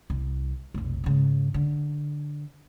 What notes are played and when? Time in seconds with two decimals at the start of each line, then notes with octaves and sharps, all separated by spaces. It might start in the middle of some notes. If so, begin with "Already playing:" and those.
0.10 C2
0.74 F1 B1
1.04 G#2 C#3
1.54 D3